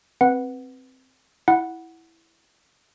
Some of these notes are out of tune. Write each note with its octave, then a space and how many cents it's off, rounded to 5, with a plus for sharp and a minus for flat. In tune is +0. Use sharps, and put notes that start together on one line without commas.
C4 +0 B4 +0 F#5 +0
E4 +0 F#5 +0